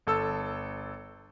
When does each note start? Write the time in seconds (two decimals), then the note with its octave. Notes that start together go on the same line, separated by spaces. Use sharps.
0.07 G1 A4 E6